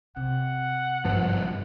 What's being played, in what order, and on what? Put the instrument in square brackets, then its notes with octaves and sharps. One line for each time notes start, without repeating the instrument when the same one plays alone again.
[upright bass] C3 [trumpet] F#5
[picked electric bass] G#1 G2 F3